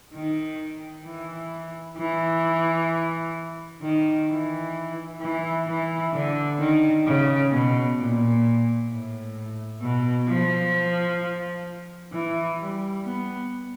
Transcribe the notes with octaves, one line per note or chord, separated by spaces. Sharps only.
D#3
E3
E3
D#3
E3
E3
E3
D3
D#3
C#3
B2
A#2
A2
B2
F3
E3
G3
B3